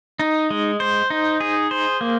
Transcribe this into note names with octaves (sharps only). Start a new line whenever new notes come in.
D#4
G#3
C5
D#4
G#4
C5
A#3